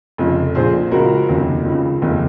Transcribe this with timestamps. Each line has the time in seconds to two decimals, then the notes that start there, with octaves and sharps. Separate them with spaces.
0.18 F1 F2 C#3
0.55 A#1 A#2 G#4 C5
0.91 C#2 C#3 F#4 A#4
1.29 F1 D#2 C#3
1.64 C#2 C#3
2.02 F1 D#2 C#3